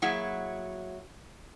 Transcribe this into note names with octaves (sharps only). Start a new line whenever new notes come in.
F#3 A#3 E4 F#4 G#4 E5